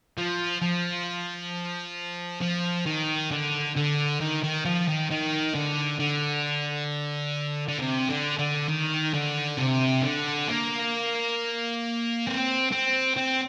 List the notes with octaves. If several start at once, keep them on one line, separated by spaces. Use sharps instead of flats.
F3
F3
F3
D#3
D3
D3
D#3
D#3
F3
D#3
D#3
D3
D3
D3
C3
D3
D3
D#3
D3
C3
D3
A#3
C4
C4
C4